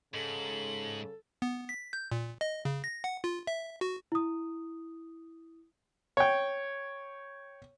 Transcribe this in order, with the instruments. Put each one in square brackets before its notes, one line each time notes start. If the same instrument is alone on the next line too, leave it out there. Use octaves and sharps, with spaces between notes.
[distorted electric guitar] G#2 [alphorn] C#3 [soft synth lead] A4 [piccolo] F#7
[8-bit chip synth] B3
B6
G6
A#2
D#5
C#3
A#6
F#5
F4
E5
F#4
[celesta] E4 D#6
[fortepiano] C#5 G5